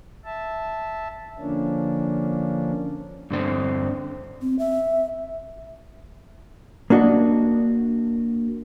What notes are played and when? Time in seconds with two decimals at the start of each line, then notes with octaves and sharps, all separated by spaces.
0.24 E5 A5
1.39 D3 F3 A#3 C#4 D4
3.31 G2 D3 C4
4.41 C4
4.59 E5
6.90 A#3 D4 F#4 D#5